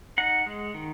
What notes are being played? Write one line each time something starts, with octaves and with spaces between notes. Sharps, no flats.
D#4 F#5
G#3
D#3